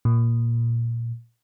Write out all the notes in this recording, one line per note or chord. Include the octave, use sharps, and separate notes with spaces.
A#2